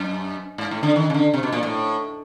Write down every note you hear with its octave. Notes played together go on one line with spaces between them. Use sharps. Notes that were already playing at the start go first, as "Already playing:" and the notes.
Already playing: F#2
G#2
A2
D3
D#3
C#3
D3
C3
B2
A#2
A2